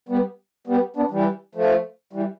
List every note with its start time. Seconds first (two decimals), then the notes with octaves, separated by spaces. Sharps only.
0.09 G3 B3
0.67 G3 B3
0.96 B3 D4
1.11 E3 G3
1.55 F3 A3
2.13 E3 G3